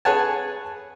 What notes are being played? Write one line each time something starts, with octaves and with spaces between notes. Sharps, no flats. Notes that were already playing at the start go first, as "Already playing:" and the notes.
G#4 B4 C#5 F#5 G#5 A5